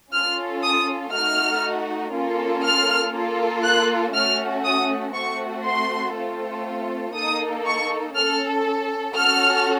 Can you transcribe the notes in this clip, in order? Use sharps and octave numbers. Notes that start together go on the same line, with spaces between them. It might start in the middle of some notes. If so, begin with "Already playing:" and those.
C#4 F4 A4 F6
D#6
A3 D#4 F#4 F6
A#3 C#4 F4 A4
F6
A#3 F4 A4
F#6
A3 C#4 F#4 F6
D#6
A3 C4 F#4 C#6
C6
A3 C4 F4 A4
A#3 D#4 A4 D#6
C#6
C#4 A4 F6
C#4 F#4 A4 F6